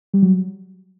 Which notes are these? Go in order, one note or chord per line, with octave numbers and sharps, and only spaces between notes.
G3
F#3